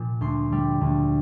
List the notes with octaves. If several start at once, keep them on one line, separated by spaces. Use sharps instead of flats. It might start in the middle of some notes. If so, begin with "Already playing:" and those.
Already playing: A#2 F3
D2 C6
D3 G3
D2